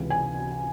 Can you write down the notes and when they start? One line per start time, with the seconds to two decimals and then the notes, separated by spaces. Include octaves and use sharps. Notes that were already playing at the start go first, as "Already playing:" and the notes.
Already playing: C#2 C3 E3
0.10 G#5